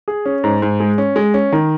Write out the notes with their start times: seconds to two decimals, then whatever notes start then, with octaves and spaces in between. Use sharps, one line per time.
0.08 G#4
0.26 C#4
0.44 G#2
0.62 G#2
0.80 G#3
0.98 C#4
1.16 G#3
1.34 C#4
1.52 D#3